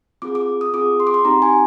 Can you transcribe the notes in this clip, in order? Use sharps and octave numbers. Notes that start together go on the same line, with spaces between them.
C4 F4 G#4 D6
D6
D#6
C4 F4 G#4 D6
C6
D6
C6
C4 D#4 G4 A#5
G#5